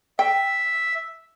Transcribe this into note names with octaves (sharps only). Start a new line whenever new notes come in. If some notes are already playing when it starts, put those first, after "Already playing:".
E5 G5